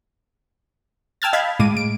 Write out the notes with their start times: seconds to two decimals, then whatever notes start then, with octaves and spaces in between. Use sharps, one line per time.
1.22 G5 A5 E6 F6 G#6 A6
1.33 D#5 F5 B5 G#6
1.59 A2 G#3 D6 D#7
1.77 D7